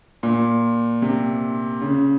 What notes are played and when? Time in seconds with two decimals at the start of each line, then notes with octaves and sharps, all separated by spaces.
0.23 A#2
1.02 C3
1.81 C#3